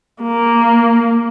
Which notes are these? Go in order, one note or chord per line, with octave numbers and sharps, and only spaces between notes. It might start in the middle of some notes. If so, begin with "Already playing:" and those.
A#3